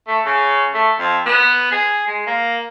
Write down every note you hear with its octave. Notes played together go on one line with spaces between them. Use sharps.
A3
C#3
A3
F2
B3
G#4
G#3
A#3